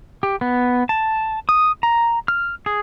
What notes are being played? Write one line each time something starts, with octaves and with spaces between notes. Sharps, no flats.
G4
B3
A5
D#6
A#5
F6
G#4